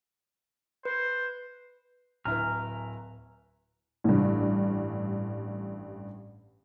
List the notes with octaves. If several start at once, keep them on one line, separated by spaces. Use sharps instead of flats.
B4 C5
D1 E4 B4 G#5 A#5 F6
A1 G2